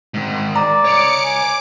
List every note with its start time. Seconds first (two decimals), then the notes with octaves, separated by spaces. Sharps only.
0.14 G#2 D#3
0.56 D5 A#5
0.85 C#5 D#5 D6 C#7
1.24 G#5 D6